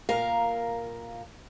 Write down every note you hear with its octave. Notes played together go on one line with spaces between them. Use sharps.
A#2 A#4 F5 A#5